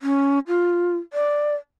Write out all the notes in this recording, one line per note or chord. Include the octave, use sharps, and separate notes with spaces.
C#4
F4
D5